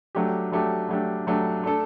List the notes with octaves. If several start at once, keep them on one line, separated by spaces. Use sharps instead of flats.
F#3 A3 D4 G4
F#3 A3 D4 G4
F#3 A3 D4 G4
F#3 A3 D4 G4
A3 D4 A4